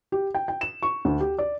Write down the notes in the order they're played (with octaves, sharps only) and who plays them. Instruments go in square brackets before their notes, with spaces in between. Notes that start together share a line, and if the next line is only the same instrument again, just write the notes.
[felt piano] G4
G5
G5
E7
C#6
D2
G4
D5